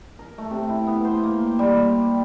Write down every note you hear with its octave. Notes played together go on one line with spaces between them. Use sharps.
A#4
A3
C3
E4
B3
C5
A#3
G5
G3
G4